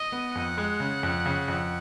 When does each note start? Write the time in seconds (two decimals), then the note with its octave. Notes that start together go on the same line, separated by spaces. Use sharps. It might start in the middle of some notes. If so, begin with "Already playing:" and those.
Already playing: D#5
0.12 B3
0.35 F2 F#5
0.58 G#3
0.80 C#3
1.03 F2
1.26 C#3
1.48 F2